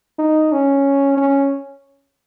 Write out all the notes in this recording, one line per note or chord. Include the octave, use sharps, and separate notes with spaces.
D#4
C#4
C#4